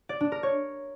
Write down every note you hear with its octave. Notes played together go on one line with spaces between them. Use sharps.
D5
D4
A#4
C#5